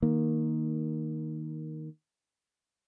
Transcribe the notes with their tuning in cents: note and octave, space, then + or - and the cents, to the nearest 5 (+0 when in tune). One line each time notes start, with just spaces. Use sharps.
D#3 +0 A#3 +0